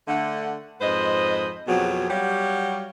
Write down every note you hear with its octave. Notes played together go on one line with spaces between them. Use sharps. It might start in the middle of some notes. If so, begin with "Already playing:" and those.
D3 A3 F#5
F2 G#2 B4 C5 D#5
F2 B2 F#3 G4 G#4
F#3 G3 G4 C#5 F5 F#5